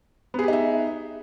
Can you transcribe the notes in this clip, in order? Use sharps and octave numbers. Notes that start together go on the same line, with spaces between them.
B3 D#4 G4 G#4 E5